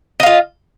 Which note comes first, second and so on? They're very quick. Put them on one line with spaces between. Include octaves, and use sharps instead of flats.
D#5 F5 F4